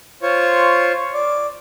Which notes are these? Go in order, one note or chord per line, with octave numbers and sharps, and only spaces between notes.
F4 C5 C#5 C#6
D5